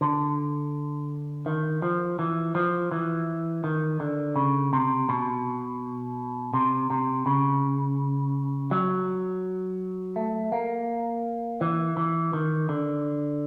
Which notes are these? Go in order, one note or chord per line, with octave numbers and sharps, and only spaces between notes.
D3
D#3
F3
E3
F3
E3
D#3
D3
C#3
C3
B2
C3
C3
C#3
F#3
A3
A#3
E3
E3
D#3
D3